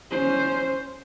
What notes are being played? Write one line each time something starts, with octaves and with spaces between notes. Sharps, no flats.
C#4 C5